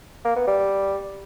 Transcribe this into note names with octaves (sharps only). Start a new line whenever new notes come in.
A#3
B3
G3